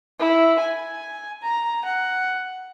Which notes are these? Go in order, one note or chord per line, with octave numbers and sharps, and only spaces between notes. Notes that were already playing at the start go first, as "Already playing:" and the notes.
E4
G#5
A#5
F#5